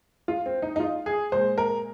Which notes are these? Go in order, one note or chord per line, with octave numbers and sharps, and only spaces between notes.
F4
C4
D#4
D#4
F4
G#4
A#2 G#3 C5
A#4